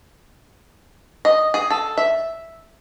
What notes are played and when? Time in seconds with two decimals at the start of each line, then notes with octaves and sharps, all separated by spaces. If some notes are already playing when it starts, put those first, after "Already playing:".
1.25 D#5
1.54 G#4
1.70 A4
1.97 E5